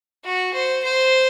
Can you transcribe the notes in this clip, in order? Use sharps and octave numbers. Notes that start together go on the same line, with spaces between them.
F#4
C5
C5